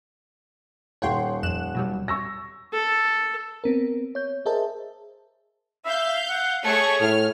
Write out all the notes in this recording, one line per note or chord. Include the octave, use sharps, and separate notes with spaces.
D#1 C#5 F#5 G5 C6
F2 F#6 E7
B2 F#3 G3
C#6 E6 A#6
A4
B3 C4 A#4
C#5 G6
G#4 A#4 C5 D#5 E5 A5
E5 F5 G6
F#5
A3 G#4 C#5 C#6
A2 F6